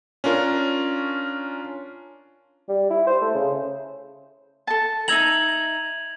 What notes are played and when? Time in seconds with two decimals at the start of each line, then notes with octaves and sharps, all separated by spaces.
0.24 C#4 D4 F4 A#4
2.69 G3
2.91 E4
3.07 C5
3.21 A3
3.35 C#3
4.67 A4 A5
5.08 D#4 E5 A#5 G#6 F7 F#7